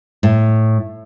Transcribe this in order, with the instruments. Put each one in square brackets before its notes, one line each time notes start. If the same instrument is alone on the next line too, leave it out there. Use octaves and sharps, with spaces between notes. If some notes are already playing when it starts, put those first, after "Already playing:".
[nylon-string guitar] A2